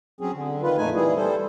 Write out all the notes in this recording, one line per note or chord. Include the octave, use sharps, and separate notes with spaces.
F#3 C4 C#4 G#4
D3
D#3 F4 B4
F2 A#2 A3 D#4 G#5
E3 G3 E4 G#4
G3 A4 C5